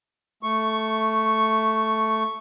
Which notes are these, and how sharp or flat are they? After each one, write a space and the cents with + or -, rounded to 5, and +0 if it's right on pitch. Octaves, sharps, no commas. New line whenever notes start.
A3 +0 C#6 +0